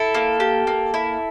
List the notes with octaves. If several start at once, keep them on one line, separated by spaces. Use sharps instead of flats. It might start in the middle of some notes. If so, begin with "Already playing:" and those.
Already playing: E4 A4
A#3
G4
A#3
E4